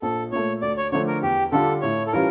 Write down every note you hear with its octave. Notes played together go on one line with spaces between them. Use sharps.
A#1 A4
A#2 A3 C#5
D2 D5
C#5
D3 F3 A3 D4 C#5
A#4
E2 G4
D3 G3 D4 F4 A4
A2 C#5
A4
E3 G3 C#4 F4 A#4